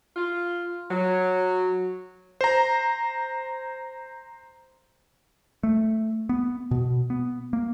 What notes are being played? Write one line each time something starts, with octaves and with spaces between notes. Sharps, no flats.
F4
F#3
C5 A#5
A3
B3
B2
B3
A#3